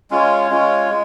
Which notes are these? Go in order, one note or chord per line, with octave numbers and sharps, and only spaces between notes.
G#3 C#4 F4 C#5
G#3 C#4 F4 C#5
G#3